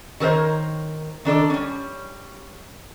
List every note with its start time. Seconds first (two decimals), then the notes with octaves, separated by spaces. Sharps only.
0.20 D#3 A4 A#4 C5 C#5
1.25 D#3 D4 A4 D5
1.50 G3 C#4